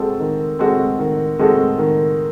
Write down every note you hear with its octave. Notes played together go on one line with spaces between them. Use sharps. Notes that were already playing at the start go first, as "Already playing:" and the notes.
Already playing: G#3 C4 F#4 A4
D#3
G#3 C4 F#4 A4
D#3
G#3 C4 F#4 A4
D#3